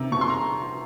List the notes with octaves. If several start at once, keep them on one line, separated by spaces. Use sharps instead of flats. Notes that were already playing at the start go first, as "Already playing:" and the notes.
Already playing: C3 D#3 A#5
C3 C#6
C6
A#5